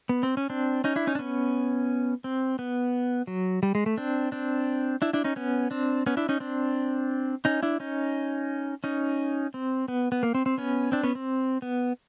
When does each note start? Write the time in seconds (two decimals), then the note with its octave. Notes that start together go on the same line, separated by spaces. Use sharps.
0.09 B3
0.23 C4
0.37 C#4
0.50 C4 D4
0.84 C#4 D#4
0.96 D4 E4
1.07 C#4 D#4
1.15 D4
1.19 B3 C#4
2.24 C4
2.59 B3
3.27 F#3
3.63 G3
3.75 G#3
3.86 A3
3.98 C4 D4
4.32 C4 D4
5.02 D4 E4
5.13 D4 E4
5.24 C#4 D#4
5.36 B3 C#4
5.71 C4 D4
6.06 B3 C#4
6.17 D4 E4
6.29 C#4 D#4
6.40 C4 D4
7.45 C#4 D#4
7.63 D4 E4
7.80 C#4 D#4
8.84 C#4 D#4
9.54 C4
9.88 B3
10.12 B3
10.23 A#3
10.35 C4
10.46 C4
10.58 B3 C#4
10.92 C4 D4
11.03 B3 C#4
11.15 C4
11.62 B3